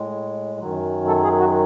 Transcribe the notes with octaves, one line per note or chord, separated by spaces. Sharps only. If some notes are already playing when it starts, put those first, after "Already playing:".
Already playing: A2 G#3
F#2 D#3 F#3
A4
G#4
F#4